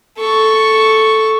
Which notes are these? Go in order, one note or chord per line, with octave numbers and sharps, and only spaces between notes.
A4 C#6